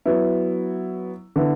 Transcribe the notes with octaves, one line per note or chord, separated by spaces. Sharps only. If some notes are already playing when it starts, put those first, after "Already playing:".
F#3 B3 E4
D3 B3 E4